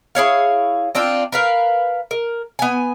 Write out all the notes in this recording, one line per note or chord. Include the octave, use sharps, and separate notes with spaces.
E4 G#4 C#5 F5
C4 D4 F4 G5
A#4 B4 F5
A#4
B3 G#5